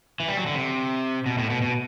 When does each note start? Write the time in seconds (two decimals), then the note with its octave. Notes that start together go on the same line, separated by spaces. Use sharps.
0.20 E3
0.28 G3
0.37 F#3
0.46 D3
0.55 C3
1.26 B2
1.38 A2
1.50 B2
1.62 B2